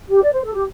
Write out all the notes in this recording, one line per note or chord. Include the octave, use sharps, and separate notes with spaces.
G4
D5
C5
A4
G4